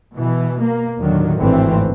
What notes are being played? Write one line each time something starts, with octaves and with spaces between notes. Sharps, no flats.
B2 E3
A#3
D#2 A2 D3 D#3 F#3
G#1 D2 A2 E3 A3 C4